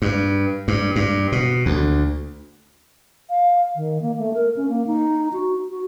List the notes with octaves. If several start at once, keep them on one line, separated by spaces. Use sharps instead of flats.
G2
G2
G2
B2
D2
F5
D#3
A#3
A3
A#4
C#4
A#3
D#4
F#4
F#4